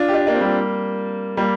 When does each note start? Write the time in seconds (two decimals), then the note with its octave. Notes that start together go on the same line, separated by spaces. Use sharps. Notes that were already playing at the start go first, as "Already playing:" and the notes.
Already playing: D4 F4
0.08 G4
0.13 D4 F4
0.27 A#3 D4
0.35 C4
0.41 G3 A#3
1.37 G3 A#3